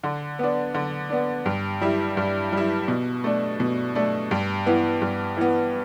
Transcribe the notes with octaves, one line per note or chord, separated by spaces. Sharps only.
D3
B3 D4
D3
B3 D4
G2
G3 E4
G2
G3 E4
B2
A3 D4
B2
A3 D4
G2
E3 B3
G2
E3 B3